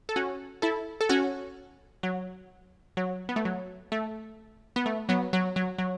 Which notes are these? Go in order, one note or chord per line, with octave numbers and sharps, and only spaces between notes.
A4
C#4 F#4
E4 A4
A4
C#4 F#4
F#3
F#3
B3
A3
F#3
A3
B3
A3
F#3 B3
F#3
F#3
F#3